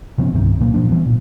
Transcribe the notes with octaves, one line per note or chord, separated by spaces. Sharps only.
C3 F3 B3 C#4
C2 G2 C3 D#3
A#2 F#3 A#3
A#2 F3 D4
E3 F#3 G3 B3
A#2